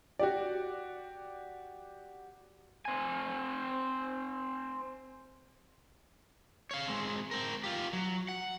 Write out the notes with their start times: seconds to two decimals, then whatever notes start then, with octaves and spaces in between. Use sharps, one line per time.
0.19 F#4 G4 D5
2.85 C4 G#5
6.71 C#5 F5
6.88 G#3 C4
7.31 C4 A#4
7.64 F4 G4
7.93 F#3
8.28 F#5